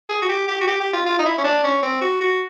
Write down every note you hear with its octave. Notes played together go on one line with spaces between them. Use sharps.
G#4
F#4
G4
G4
F#4
G4
G4
F4
F4
D#4
E4
C#4
D4
C#4
C4
F#4
F#4